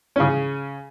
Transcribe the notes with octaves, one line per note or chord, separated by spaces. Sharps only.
C#3 C#4